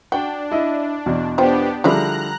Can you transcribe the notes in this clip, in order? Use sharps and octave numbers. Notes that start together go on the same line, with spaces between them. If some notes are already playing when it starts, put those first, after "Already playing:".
D4 F#4 G5
E4 D#5
E2 B2
B3 D4 F4 G4 C5 G5
D3 F3 G3 G#3 E4 D5 A#5 F#6